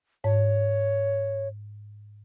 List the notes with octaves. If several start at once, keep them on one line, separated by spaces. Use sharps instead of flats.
G#2 C#5